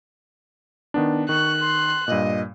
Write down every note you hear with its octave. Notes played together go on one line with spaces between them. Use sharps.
D#3 B3 D4
D#3 C#6 F#6
C6
G2 A#2 D#5